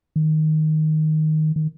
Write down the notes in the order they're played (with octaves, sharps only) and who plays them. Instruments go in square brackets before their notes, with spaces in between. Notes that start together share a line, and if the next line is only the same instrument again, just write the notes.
[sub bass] D#3
D#3